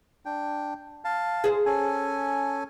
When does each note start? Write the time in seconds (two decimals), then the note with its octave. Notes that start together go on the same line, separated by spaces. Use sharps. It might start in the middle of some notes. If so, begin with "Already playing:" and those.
0.26 D4 G5
1.05 F5 A5
1.44 G#4 C5
1.66 C#4 A4 G#5